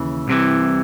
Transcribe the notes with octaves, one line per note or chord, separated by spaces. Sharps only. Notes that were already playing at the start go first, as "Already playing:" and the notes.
Already playing: D#2 C#3 E3
C2 C3 E3